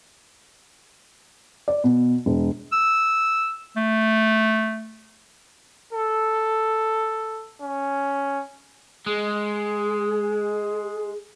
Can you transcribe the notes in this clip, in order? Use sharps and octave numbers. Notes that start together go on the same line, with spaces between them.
D5
B2
E1
E6
A3
A4
C#4
G#3 G#4